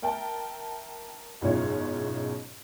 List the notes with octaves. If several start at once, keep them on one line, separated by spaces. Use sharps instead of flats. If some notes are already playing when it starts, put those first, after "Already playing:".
A#4 E5 G5 A5
F#1 G#2 B2 F4 C#5 E5